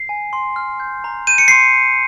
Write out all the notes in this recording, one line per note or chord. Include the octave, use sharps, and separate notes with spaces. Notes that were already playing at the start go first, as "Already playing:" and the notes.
Already playing: C7
G#5
C6
F6
G6
A#5
G6 D#7
C#7
C6 C7